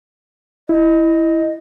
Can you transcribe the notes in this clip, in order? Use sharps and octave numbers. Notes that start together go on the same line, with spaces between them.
E4 D#5